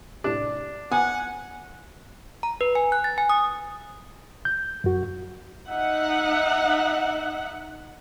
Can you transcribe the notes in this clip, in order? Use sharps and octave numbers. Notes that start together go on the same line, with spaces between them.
A2 C3 D4
B3 F#5 G#5
A#5
B4
G#5
F#6
A6
G#5
D#6
G6
F#2 F#4
D#4 E5 F#5